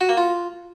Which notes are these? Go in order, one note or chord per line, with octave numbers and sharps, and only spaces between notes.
F#4
A#3
F4